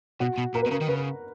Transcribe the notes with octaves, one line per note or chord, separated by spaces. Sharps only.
B2 F#4
B2
A#2 A#4
B4
B2
C#3 A#4
D#3
C#3 B4